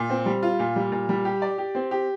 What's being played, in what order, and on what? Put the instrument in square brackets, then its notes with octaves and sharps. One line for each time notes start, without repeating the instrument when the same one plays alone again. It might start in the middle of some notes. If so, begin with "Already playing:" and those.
Already playing: [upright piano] A#2
C4
G3
F4
A#2
G3
A#2
G3
G4
D5
G4
C4
G4